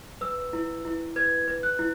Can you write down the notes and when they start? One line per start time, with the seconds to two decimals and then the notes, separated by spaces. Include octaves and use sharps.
0.21 B4 E6
0.53 E4
0.85 E4
1.16 B4 G#6
1.48 B4
1.63 F#6
1.79 E4